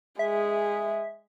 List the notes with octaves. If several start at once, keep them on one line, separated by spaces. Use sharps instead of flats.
G#3 G#4 E5